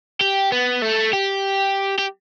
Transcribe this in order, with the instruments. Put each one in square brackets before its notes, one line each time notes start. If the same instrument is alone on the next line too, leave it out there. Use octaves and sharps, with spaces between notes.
[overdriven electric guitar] G4
B3
A3
G4
G4